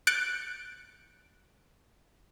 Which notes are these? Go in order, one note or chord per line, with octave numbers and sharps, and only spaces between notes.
F#6 G6 A6 C#7 D7